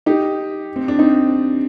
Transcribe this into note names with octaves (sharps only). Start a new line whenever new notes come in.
D#4 G4
C4
D4
C4 D#4